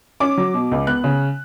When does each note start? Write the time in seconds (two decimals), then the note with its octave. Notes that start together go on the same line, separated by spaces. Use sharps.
0.20 C#4 D6
0.37 F#3
0.54 B2
0.72 C#2
0.87 B3 F#6
1.04 C#3